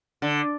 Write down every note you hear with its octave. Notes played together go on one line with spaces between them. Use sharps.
D3